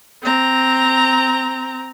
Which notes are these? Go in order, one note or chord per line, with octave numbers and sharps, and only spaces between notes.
C4 A#5